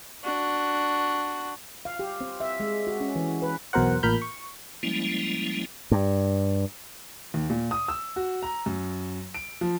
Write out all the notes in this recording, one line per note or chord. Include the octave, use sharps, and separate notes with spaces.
D4 F#4
F5
G4
C4
E5
G#3
F#4
C#4
E3
B4
B1 E2 B2 A#4 C5 F#5
A1 A#2 A#4 B5 F6 G6
C#6
F3 G3 G#3 A#3 C#4 E4
G2
D#2
A#2
D#6
E6
F#4
A#5
F#2
D7
F3